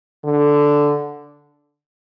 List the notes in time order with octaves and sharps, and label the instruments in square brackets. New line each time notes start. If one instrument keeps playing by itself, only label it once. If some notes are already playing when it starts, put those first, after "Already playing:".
[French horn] D3